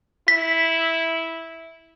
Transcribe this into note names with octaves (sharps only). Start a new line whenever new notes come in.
E4 B6